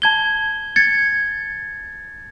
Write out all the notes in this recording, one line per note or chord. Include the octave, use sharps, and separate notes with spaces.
A5 G#6 G7
G#6 A6 C#7